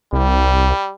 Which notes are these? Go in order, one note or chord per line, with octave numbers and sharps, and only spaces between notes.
C2 G3